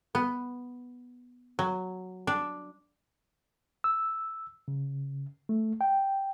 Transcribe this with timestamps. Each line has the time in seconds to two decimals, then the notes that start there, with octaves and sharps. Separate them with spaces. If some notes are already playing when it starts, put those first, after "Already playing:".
0.15 B3
1.59 F#3
2.27 D4
3.84 E6
4.68 C#3
5.49 A3
5.81 G5